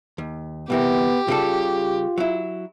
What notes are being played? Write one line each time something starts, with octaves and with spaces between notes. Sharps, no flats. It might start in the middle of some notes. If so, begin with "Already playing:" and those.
D#2
C2 E3 B3 G4 A#4
C#3 G3 F4 A4
F#3 E4